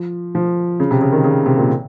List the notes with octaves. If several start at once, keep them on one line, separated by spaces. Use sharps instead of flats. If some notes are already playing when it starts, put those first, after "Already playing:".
Already playing: F3
F3
C#3
C3
C#3
D#3
C#3
C3
A#2